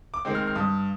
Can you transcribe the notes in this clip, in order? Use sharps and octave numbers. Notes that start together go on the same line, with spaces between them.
D6
D#3 G#3 C4
F6
F6
G2 D#6